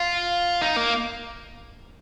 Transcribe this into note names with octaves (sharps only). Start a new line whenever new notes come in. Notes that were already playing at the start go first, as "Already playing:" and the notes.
Already playing: F4
D#4
A#3